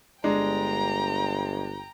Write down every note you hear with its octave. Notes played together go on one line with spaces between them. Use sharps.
G1 G#3 D4 G5 A#5